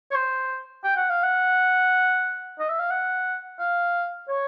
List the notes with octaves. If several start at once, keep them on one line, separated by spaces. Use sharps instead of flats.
C#5
C5
G5
F#5
F5
F#5
D#5
E5
F5
F#5
F5
C#5